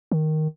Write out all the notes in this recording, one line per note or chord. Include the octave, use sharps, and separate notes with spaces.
D#3